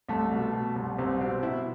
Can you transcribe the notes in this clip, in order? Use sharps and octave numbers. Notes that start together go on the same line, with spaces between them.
C2 A3
B2
B2
C2
C2 C4
B2 C4
B2 E4